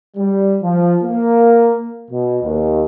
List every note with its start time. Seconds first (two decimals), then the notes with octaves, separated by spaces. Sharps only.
0.17 G3
0.61 F3
1.03 A#3
2.10 B2
2.42 D#2